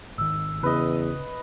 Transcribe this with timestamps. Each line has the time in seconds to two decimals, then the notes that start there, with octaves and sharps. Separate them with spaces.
0.18 G#1 D#3 E6
0.63 E2 C#3 B4 D#5